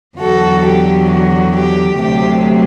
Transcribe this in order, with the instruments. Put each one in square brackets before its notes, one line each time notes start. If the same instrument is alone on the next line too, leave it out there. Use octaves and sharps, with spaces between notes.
[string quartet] E2 D3 F#3 F#4 A4
G4
F#4
G4
D2 C3 F#3 G4